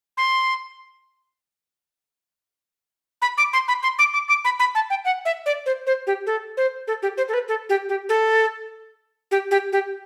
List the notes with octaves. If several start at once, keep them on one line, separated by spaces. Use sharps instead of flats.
C6
B5
D6
C6
B5
C6
D6
D6
D6
B5
B5
A5
G5
F#5
E5
D5
C5
C5
G4
A4
C5
A4
G4
C5
A4
B4
A4
G4
G4
A4
G4
G4
G4